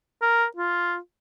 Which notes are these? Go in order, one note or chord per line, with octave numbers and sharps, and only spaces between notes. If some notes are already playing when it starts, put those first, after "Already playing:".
A#4
F4